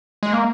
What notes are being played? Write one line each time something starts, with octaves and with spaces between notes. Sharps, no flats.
G#3
A#3